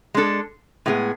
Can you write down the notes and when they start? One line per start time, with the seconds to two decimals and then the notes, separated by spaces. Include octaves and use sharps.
0.14 G#3 D4 A4
0.86 A2 G#3 B3 E4 G#4